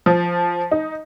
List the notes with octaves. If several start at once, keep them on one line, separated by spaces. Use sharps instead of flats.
F3
D#4